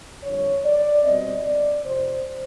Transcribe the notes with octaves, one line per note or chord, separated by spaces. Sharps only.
F2 D3 G3 C#5
D5
B2 G3 C4 D#5
D5
F2 C3 F3 C5